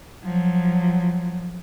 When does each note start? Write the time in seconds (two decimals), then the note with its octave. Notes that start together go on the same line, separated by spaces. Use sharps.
0.24 F3 F#3